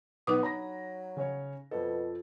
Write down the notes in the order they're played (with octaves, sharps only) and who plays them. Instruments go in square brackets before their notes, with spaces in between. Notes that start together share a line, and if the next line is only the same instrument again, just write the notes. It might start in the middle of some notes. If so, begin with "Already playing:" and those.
[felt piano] B1 B4 [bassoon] B3 [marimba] D#4 D6 D#6
[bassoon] F#3 [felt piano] A#5 B5 A#6
[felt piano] C#3 C#4 C#5
[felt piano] F2 F3 A4 [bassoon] B2